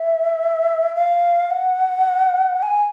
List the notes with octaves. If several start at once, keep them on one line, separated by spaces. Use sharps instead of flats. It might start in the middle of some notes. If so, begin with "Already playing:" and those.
Already playing: E5
F5
F#5
G#5